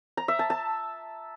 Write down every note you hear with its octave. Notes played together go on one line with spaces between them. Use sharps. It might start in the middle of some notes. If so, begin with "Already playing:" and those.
A#5
E5
A5
A5